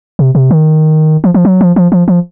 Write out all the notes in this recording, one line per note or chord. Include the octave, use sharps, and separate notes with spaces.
C3
C3
D#3
F3
F3
F#3
F3
F3
F3
F3